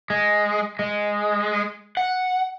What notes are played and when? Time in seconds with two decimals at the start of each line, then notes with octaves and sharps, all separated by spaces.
0.10 G#3
0.79 G#3
1.97 F#5